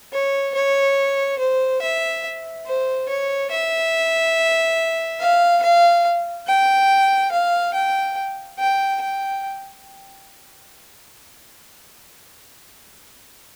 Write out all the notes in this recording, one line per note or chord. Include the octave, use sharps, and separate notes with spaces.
C#5
C#5
C5
E5
C5
C#5
E5
F5
F5
G5
F5
G5
G5
G5